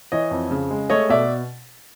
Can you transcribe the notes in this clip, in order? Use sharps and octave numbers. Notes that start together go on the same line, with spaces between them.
E3 C#5 D#5
F2
C#3
G#3
A3 C#5 D#5
B2 D5 E5